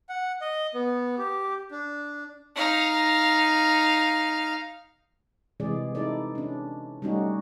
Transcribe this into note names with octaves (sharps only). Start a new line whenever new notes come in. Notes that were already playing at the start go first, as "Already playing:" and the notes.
F#5
D#5
B3
G4
D4
D#4 F5
C3 E3 G#3 G#4 D5
D#4 E4 A4 D5
C#4 D4
G3 A3 C#4 D#4 F#4